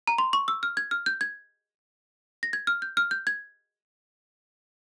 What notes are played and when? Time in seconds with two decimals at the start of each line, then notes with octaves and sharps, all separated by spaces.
0.07 A#5
0.18 C6
0.33 C#6
0.48 E6
0.63 F6
0.77 G#6
0.91 F6
1.06 G6
1.21 G#6
2.43 A#6
2.53 G#6
2.67 F6
2.82 G6
2.97 F6
3.11 G6
3.27 G#6